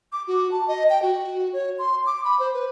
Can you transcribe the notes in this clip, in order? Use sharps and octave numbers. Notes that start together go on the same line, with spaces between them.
D6
F#4
A5
D#5
G5
F#4
C#5
C6
D6
B5
C5
B4